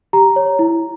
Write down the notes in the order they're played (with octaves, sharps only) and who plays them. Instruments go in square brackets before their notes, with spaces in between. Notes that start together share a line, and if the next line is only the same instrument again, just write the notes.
[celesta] G4 A#5
C#5
E4